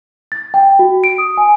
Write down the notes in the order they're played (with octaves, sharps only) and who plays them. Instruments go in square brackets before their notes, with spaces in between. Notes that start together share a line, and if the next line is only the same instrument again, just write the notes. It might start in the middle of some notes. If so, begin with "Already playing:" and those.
[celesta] A6
G5
F#4
D7
D#6
G#5